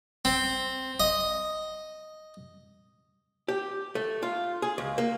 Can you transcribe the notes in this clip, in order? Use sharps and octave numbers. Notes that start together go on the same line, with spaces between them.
C4
D#5
G4
A3
F4
G#4
C#2
A#3